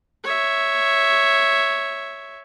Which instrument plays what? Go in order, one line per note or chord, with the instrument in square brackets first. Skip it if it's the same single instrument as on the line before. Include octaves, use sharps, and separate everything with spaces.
[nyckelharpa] C#5 E5